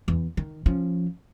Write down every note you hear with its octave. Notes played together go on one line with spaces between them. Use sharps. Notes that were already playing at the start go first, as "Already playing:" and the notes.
E2
D#3
F3 C#4